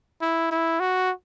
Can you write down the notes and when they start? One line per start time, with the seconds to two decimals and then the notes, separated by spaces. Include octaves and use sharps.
0.22 E4
0.51 E4
0.80 F#4